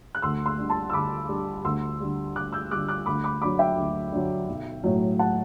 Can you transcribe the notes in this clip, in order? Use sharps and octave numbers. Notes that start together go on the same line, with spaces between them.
F#6
D2 C6 E6
C6 E6
D3 G3
A5 C6
E6
D2 B5 D6
D3 G3
D2 C6 E6
D3 G3
D2 D6 F#6
E6 G6
D3 G3 D6 F#6
D6 F#6
D2 B5 D6
B5 D6
D3 F#3 B5 D6
E5 G5
D2
D3 F#3
B1
A2 F#3
F#5 A5